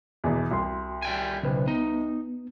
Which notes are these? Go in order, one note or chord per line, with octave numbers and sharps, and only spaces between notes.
E2 B2 E3
C2 F#4 C6
G3 G5 G#5
B1 C#3 B4 C5
B3 D#4